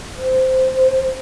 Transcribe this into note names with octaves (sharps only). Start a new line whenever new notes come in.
C5